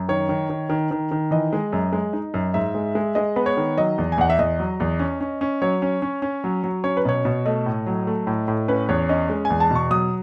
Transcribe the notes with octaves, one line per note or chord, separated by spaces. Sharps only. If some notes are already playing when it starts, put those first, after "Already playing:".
Already playing: F#2
D#3 C#5
D#3
D#3
D#3
D#3
D#3
E3 D#5
G#3
F#2
G#3
D#4
F#2
G#2 E5
G#3
G#3
G#3 D#5
B3 B4
C#5
D#3
F#3 D#5
E2
G#5
E2 F#5
E5
E2 D#5
F#3
E2
C#4
C#4
C#4
F#3 C#5
C#4
C#4
C#4
F#3
F#3
C#4 C#5
B4
B2 C#5
B2
A3 D#5
A2
F#3
A3
A2
A2
C#4 B4
E2 C#5
C#4 D#5
G#3
G#5
E2
A5
B2 C#6
F#3 D#6